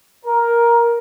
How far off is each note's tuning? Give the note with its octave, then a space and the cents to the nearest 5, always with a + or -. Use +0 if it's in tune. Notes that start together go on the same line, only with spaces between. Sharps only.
A#4 +10